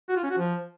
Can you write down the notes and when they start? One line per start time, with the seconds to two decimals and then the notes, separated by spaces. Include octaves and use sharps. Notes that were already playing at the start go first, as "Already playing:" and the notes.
0.09 F#4
0.16 F4
0.23 C#4
0.31 F#4
0.38 F3